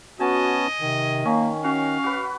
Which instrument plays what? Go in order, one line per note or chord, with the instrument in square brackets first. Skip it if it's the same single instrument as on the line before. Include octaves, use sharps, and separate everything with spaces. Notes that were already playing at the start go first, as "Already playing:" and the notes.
[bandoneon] B3 C#4 A5 [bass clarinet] F#4 [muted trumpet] D#5 [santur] G#5
[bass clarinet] C3 [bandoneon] D#3
[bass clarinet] A#3 [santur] C#4
[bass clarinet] C#4 [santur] F#4 [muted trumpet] F5
[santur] F#4 B4